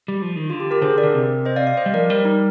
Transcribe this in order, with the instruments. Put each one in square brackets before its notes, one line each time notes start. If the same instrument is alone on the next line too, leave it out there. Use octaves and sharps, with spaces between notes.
[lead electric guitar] G3
F3
D#3
[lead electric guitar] D3 [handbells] F4
[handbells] G4
G4 A#4
[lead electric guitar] D3 [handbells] G#4 C5
[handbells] A#4 D5
[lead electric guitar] D3
C3
[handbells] C5 D#5
D5 F5
D5 F5
C5 D#5
[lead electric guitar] G3
[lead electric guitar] F3 [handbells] A#4 D5
[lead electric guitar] G3 [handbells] A#4 D5
[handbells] D#4